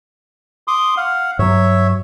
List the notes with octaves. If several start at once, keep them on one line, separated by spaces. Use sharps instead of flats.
C6 D6 D#6
F5 F#5
G2 F#3 C#5 E5